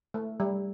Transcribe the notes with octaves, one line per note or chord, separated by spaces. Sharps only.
A3
G3